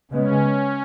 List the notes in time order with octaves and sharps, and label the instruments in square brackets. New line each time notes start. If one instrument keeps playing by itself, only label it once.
[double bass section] C#3 G#3 B3 [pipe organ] C#4